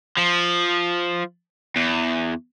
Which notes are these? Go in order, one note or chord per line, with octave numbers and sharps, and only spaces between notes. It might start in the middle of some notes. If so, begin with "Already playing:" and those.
F3
E2